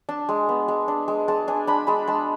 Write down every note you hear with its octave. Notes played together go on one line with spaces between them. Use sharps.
D4 A5
G#3
B3
G#3
D4
G#3
G#3 A5
D4 G#5
D4 B5
G#3 B5
G#3 A5